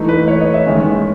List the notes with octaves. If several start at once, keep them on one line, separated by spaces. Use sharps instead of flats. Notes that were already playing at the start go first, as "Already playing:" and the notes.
Already playing: E3 A3 D#4
B4
C#5
D#5
E5
D#3 G#3 C#4